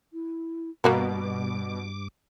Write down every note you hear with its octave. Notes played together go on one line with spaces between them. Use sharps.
E4
G2 B2 G3 A#3 F#4 A#4 D6